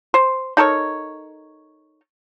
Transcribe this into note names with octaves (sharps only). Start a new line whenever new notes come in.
C5
D#4 A4 A#4 C#5